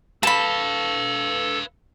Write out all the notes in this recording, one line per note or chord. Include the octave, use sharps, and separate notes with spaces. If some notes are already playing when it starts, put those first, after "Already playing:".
A4 B4 F5 A5 B5